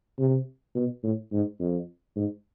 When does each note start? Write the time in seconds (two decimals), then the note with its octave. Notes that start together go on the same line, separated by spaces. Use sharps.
0.19 C3
0.75 B2
1.03 A2
1.32 G#2
1.60 F2
2.16 G#2